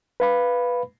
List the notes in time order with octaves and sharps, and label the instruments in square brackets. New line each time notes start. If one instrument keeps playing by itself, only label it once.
[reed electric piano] B4 F5 B5